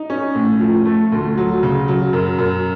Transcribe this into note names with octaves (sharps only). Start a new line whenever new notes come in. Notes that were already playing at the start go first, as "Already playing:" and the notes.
Already playing: D#4
C#4
A2
F3
A3
D2
F#3
C#3
F#3
F#2
F#2